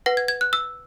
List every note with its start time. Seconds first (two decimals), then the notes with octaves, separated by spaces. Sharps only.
0.06 B4 F#5 A#6
0.17 G#6
0.28 G#6
0.41 F#6
0.53 E6